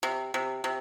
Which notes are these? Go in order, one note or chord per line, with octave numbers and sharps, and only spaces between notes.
C3
C3
C3